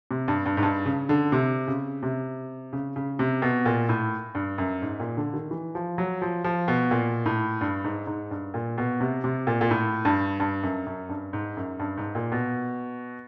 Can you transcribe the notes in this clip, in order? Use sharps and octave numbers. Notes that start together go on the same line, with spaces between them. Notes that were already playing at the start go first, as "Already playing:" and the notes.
C3
G2
G2
G#2
G2
C#3
D3
C3
C#3
C3
C#3
C#3
C3
B2
A#2
A2
G2
F#2
G#2
A#2
D3
D#3
E3
F3
F#3
F3
F3
B2
A#2
A2
G2
G#2
G#2
G2
A#2
B2
C3
C3
A#2
A#2
A2
G2
G2
F#2
F#2
G2
G#2
F#2
G2
G#2
A#2
B2